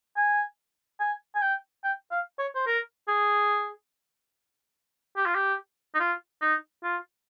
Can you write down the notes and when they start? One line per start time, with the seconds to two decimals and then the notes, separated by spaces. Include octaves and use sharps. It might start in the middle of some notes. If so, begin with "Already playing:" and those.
0.17 G#5
1.00 G#5
1.35 G#5
1.42 G5
1.84 G5
2.11 F5
2.39 C#5
2.55 C5
2.67 A#4
3.08 G#4
5.17 G4
5.26 F4
5.35 G4
5.95 D#4
6.00 F4
6.42 D#4
6.84 F4